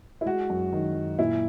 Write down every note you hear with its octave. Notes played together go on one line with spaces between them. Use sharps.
E4
G#3 F#4
F#2
D#3
F#2
A#2 E4